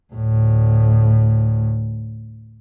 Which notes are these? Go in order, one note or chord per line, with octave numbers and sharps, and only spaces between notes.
D2 A2